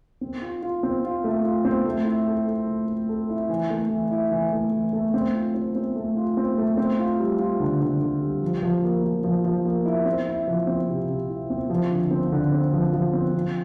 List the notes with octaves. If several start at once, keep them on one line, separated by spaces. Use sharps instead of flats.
C4
F4
F4
C4
F4
A3
F4
C4
A3
E4
A4
A4
A3
A3
A4
E4
E3
A3
E3
E4
E3
A3
E3
A3
C4
F4
C4
C4
A3
F4
C4
A3
C4
F4
G3
F4
D3
D3
D3
G3
F3
F3
A#3
F3
F3
F3
A#3
E4
C4
E4
F3
C4
C3
C3
E4
C4
F3
D3
C4
D3
C4
F3
F3
C4
F3